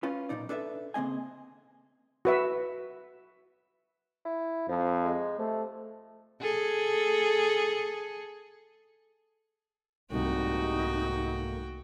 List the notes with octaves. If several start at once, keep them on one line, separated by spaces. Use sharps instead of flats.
C#4 F4 B4
B1 F#2 A#2 D#4 D5
D4 A4 B4 C#5 E5
C#3 A#3 C4 D#5 G#5
F#4 B4 E5
E4
F2 F3
G#3
C3 A3
G#4 A4
C2 G#2 A3 A#3 D#4 F#4 G5